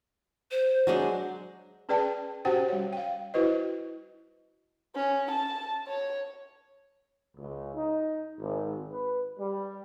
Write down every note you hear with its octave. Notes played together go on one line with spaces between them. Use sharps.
C5
F#3 G#3 D4
C#4 G#4 B4 D5 G5 A5
C#4 F#4 G4 C5 F#5 G5
G3 C#5
F5 G5
E4 F#4 B4 C5 D#5
C#4
A5
C#5
C#2
D#4
G#1
B4
G3